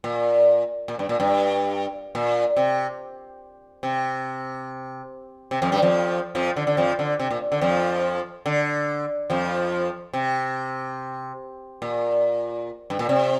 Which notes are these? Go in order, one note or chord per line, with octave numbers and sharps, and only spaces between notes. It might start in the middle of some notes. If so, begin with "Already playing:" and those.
A#2
A#2
G2
A#2
G2
A#2
C3
C3
C3
F2 F3
G2 G3
F2 F3
F2 F3
D3
D3
F2 F3
D3
C3
A#2
D3
F2 F3
D3
F2 F3
C3
A#2
G2
A#2
C3